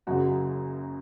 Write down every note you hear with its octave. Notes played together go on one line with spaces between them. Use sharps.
F#1 F#2 C#3 F#4